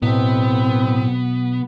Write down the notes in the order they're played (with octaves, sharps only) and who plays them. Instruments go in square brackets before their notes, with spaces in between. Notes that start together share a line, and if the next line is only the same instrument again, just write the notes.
[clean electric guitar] B1 [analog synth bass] A2 [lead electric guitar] B3 [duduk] C4